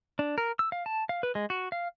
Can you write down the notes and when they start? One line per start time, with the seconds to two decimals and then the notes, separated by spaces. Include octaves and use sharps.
0.19 D4
0.38 A#4
0.59 E6
0.72 F5
0.86 A5
1.09 F5
1.23 B4
1.35 G#3
1.50 F#4
1.72 F5